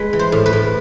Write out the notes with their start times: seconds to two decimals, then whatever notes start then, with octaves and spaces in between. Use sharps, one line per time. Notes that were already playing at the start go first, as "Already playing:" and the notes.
Already playing: G#3 B4
0.13 E3
0.19 C5
0.32 A2
0.46 B4
0.53 A2